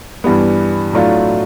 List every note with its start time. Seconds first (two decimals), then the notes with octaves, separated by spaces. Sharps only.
0.24 G2 E3 G3 B3
0.93 A2 F#3 A3 D4 F4